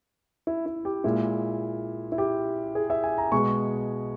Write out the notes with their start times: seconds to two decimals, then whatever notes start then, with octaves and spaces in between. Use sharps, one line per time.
0.47 E4
0.66 E4
0.85 G4
1.04 A#2 G#3 E4
2.12 E4
2.18 G4
2.75 G#4
2.90 E5
3.04 G#5
3.18 A#5
3.32 B2 G#3 C#6